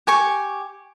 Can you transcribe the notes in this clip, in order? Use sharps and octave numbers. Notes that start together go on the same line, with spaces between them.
G4 G#5 C#6